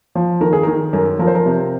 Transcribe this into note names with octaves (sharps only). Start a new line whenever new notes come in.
F3
D#3 A#4
G#4
D#3 A#4
F#2 A#4
F3 A#4
C5
A#4
C3